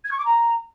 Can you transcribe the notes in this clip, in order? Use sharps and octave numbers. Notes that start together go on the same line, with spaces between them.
G#6
C#6
D6
A#5